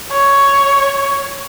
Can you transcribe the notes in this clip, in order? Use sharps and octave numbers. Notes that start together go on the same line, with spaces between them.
C#5